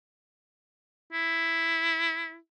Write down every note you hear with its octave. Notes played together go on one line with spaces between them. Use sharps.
E4